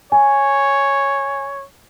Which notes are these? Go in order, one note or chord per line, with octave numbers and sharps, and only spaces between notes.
C#5 G#5